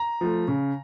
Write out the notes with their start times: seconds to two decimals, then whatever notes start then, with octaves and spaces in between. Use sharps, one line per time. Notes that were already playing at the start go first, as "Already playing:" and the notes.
Already playing: A#5
0.21 F3 A3
0.48 C#3